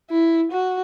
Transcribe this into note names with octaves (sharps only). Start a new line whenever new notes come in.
E4
F#4